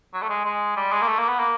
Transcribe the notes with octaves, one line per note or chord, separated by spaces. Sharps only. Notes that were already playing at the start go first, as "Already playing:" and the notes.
F#3
A3
G#3
G#3
G3
G#3
A#3
A3
A#3
B3
A#3